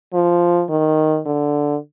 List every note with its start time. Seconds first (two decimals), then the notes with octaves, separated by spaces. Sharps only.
0.13 F3
0.69 D#3
1.26 D3